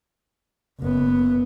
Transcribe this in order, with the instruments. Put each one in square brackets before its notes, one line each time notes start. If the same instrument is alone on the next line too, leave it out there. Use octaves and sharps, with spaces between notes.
[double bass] F#1 B3